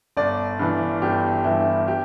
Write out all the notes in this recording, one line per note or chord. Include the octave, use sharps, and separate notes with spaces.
G1 D5
G2 E3
G1 G4
G2 E3 E4
G4